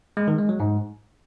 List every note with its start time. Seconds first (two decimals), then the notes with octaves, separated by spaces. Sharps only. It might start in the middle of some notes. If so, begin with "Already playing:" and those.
0.17 G#3
0.28 D#3
0.38 G#3
0.49 F#3
0.60 G#2